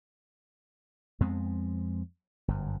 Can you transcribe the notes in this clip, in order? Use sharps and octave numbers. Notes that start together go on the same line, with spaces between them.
F2 G#3 B3 C4
G1 F#2